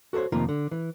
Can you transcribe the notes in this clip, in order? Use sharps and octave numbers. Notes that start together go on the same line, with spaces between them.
F#4 A4 A#4 C5 C#5
F2 C3 D#3 A#3 F4 A#4
D3
E3